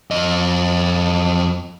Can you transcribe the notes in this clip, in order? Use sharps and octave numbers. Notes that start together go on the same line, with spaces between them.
F2 D#5